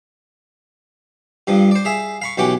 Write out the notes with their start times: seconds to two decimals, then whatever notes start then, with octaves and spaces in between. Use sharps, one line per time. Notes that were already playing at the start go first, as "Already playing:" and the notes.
1.47 G2 F3 G3
1.71 C5 D5
1.85 G#4 E5 F5
2.22 F5 B5 C#6
2.38 B1 E3 C#4 G4 F#5 D6